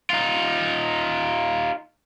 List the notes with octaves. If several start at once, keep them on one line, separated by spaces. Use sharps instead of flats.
D#4 F4